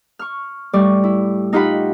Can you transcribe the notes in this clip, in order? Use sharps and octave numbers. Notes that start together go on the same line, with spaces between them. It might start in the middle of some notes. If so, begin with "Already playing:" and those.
C#6 F6
A2 G3 D5 C#6
E4
D#4 F4 G4 F#5 B5